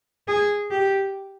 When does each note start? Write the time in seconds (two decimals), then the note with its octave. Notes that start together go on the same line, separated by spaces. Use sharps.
0.28 G#4
0.71 G4